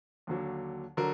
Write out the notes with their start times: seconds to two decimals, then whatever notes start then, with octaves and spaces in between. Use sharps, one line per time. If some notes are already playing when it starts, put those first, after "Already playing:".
0.27 D#2 D3 F#3
0.97 D3 F#3 A#4